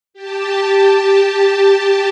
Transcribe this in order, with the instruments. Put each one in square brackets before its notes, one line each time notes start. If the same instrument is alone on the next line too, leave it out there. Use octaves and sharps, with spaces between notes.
[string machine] G4 A5